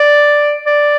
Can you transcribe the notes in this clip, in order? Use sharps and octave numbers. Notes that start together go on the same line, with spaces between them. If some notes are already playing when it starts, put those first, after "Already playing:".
Already playing: D5
D5